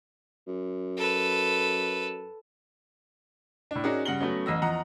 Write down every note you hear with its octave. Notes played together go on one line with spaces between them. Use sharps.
F#2
A4 B4
A2 D4
C#4 D#4 F#4 G#4 A#4 D5
G2 C#3 F#5 A#6 F#7 G7
F#3 A3 B3 C#4
A1 D#5 E6 A#6
E2 F3 D#5 F#5 A#5